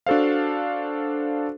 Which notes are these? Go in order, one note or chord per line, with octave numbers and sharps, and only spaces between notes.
D4 F#4 A4 C5 F5